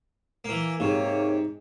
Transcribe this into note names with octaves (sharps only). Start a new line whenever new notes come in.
E3 A#3
G#2 C3 A#3 C#5